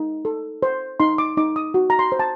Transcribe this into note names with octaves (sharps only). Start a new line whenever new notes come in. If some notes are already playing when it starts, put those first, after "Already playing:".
Already playing: D#4
A4
C5
D#4 C6
D6
D#4 D6
D#6
F#4
A#5
C6
C5
A5